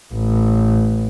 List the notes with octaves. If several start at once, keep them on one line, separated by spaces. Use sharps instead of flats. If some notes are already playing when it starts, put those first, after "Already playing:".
A1